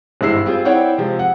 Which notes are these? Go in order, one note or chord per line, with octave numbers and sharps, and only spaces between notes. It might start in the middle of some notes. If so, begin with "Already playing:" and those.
G#1 G2 G#3 E4 E6 C7
G3 C4 F4 G#4
C4 E4 C#5 D5 F#5 G5
C3 F3 G#3
F#5